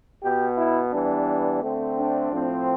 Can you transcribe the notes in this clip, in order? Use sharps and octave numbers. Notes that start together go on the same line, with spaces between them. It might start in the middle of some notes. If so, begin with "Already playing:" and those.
B2 B3 G4
E4
E3 G3 B3 D4
D3 A3 C4
D4
A2 F3 C4